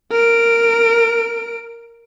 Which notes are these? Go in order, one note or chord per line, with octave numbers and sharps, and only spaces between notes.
A#4 D7